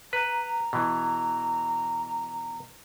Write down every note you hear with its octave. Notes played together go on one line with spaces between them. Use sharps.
B4 A#5
B2 E3